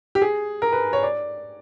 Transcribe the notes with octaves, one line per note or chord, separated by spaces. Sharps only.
G4
G#4
A#4
B4
C#5
D5